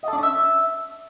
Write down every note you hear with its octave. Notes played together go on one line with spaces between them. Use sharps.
D#5
A4
D4
C#4
E5